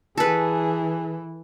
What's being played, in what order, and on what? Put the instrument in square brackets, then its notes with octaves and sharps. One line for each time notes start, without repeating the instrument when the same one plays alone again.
[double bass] E3 [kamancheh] G#4 [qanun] A4 B4